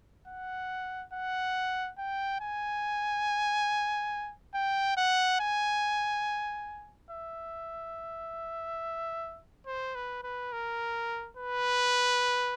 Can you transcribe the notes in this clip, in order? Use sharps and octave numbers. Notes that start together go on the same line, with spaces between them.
F#5
F#5
G5
G#5
G5
F#5
G#5
E5
C5
B4
B4
A#4
B4